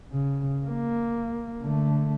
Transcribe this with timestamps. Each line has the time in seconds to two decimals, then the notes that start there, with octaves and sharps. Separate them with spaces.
0.11 C#3
0.66 A#3
1.61 D3 A3